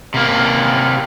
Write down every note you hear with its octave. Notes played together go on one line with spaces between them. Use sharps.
C3 A#3